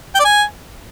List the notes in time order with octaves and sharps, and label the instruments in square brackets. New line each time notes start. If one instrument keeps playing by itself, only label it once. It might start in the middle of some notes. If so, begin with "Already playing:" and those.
[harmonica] G5
D5
G#5